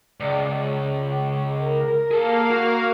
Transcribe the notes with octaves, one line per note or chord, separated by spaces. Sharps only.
C#2 D5
C#5
A#4
A#3 G#4 A4 F5
F#4